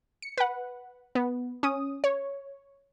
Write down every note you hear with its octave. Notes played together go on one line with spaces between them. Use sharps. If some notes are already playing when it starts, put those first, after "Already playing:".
C#7
B4 F#5
B3
C#4 D#6
C#5